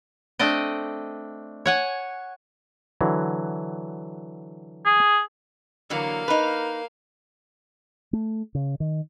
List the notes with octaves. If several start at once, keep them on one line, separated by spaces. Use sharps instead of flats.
A3 C4 D4 D5 D#5
C#5 F#5 G#5
D3 E3 F#3
G#4
D3 E3 F#3 A#3 F5
D#4 B4
A3
C#3
D#3